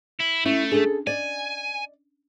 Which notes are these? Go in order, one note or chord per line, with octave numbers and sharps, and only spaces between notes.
E4
A3 C#4 E4
D4 G#4 A4
D5 D#5 G#5